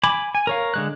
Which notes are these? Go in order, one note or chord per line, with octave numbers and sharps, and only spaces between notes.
G#5 B5 D6
G#5
A#4 C#5 F5
D3 G#3 F#6